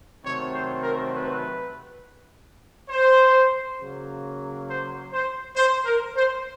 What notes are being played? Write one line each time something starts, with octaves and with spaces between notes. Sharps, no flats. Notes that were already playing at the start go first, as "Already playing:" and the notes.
C3 D#3 F#3 A3 C4 C#5
C5
A#4
B4
C5
C#3 F#3 A#3
C5
C5
C5
A#4
C5